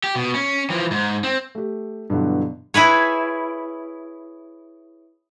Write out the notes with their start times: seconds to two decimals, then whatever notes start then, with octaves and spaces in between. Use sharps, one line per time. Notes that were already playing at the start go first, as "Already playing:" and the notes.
0.04 G4
0.16 B2
0.34 C#4
0.70 E3 F3
0.92 G#2
1.24 C4
1.55 A3 G4
2.10 G2 B2 D3 E3 F#3
2.74 E4 G#4 B4 C#5